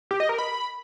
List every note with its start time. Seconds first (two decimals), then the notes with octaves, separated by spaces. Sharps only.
0.11 G4
0.20 D#5
0.29 A#4
0.38 B5